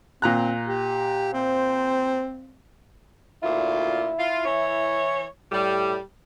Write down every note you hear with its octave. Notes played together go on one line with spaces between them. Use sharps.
A#2 C4 A#5 F#6
G4
C4 C5
D2 A#2 E4 F4
F4
E3 C#5
A2 G3